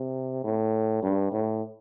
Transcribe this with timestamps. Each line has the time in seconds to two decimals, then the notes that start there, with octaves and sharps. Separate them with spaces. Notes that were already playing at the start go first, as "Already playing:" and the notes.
Already playing: C3
0.44 A2
1.03 G2
1.32 A2